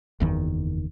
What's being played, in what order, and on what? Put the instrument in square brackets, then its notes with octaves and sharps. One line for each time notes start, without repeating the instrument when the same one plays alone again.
[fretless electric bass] F#1 E2 D#3